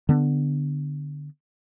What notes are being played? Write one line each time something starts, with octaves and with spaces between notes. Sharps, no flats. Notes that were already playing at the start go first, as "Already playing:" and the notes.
D3 B3